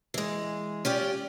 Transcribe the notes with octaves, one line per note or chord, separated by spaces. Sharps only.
E3 G#3
C#4 F4 G4 D5